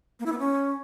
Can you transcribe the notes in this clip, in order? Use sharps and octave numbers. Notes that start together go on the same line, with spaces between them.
A#3
E4
B3
C#4